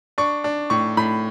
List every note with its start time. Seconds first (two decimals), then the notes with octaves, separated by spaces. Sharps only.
0.18 D4 C#6
0.44 D4
0.70 A2 C#6
0.97 A2 B5